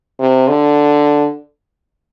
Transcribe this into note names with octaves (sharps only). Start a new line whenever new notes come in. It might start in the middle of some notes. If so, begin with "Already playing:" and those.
C3
D3